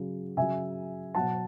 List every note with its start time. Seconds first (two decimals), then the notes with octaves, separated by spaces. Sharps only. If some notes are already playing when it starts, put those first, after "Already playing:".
Already playing: C#3 F#3
0.37 C#3 F#3 E5 G#5
1.15 B2 F#3 F#5 A5